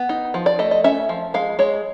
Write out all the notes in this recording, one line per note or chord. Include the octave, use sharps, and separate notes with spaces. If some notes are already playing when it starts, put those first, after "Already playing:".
Already playing: B3
D#4
F3
D5
A3 D#5
D#5
C#4 E5
F3
G#3 F5
G#3 C#5